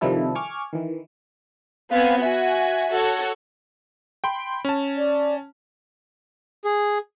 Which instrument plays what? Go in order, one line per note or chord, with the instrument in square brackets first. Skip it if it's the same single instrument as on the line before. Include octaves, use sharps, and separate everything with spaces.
[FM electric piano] C3 D#3 F3 G3 E4 A4
G#5 C#6 D6 F6 G#6
D#3 E3
[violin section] B3 C4 G#5 [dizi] F5
[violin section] F#4 G#5 [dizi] E5
[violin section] F#4 A4 C#5
[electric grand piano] G5 B5 C6
C#4 A5
[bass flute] D5
[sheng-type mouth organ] G#4